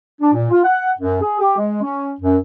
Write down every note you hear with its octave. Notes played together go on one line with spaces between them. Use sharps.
D4
A#2
F4
F#5
F#2
G#4
G4
G#3
C#4
F#2